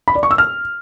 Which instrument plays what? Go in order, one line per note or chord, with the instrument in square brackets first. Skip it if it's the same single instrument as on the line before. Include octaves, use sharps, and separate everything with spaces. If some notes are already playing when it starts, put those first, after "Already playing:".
[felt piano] B5
D5
C#6
E6
F6